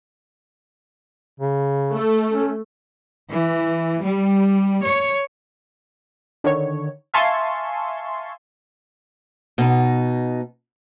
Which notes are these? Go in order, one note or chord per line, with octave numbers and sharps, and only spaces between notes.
C#3
A3
C#4
E3
G3
C#5
D3 D#3 C#5
E5 F5 G#5 A5 C6 C#6
B2 D#4